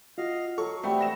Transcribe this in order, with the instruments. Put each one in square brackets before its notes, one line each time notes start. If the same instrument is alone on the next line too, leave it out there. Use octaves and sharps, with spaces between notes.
[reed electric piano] F4 F#4 [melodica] D#5 F5
[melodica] F#3 [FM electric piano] A4 [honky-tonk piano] C#6
[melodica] G3 B3 C4 [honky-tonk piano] A3 [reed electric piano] G4 E5
[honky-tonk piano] A#6 E7